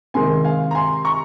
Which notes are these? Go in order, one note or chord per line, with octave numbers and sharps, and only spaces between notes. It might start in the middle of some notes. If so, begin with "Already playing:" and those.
C3 D#3 G#3 G#5 C6
F5 G#5
A#5
G#5 C6
A#5 C#6